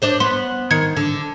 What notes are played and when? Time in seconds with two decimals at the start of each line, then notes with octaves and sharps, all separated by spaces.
0.02 D4 C5 D#5
0.20 B3 C6
0.71 D#3 G#6 C#7
0.97 D3